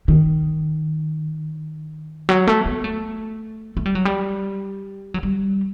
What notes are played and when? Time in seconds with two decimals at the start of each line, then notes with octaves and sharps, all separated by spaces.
0.08 D#3
2.29 F#3
2.47 A3
2.66 B3
2.84 A3
3.77 A3
3.85 G3
3.95 F#3
4.05 G3
5.14 F#3
5.23 G3